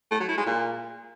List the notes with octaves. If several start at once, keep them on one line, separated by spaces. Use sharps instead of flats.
A3
F#3
E4
G#3
A#2